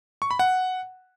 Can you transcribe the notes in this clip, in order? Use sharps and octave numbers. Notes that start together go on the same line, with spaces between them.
C#6
B5
F#5